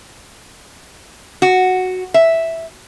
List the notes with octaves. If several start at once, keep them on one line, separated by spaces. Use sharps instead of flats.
F#4
E5